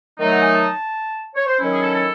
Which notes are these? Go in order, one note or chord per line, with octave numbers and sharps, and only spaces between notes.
D#3 F#3 A3 D#4
F#5
G#5
A5
C#5
C5
D#3 F#3 C#4 E4
G#4
A4
A4